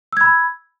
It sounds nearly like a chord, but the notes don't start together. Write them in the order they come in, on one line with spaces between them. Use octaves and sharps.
E6 G#6 B5